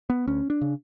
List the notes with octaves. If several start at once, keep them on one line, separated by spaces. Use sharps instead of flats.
B3
D2 C#4
D4
C#3